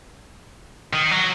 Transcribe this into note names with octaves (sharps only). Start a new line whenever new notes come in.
D#3
F#3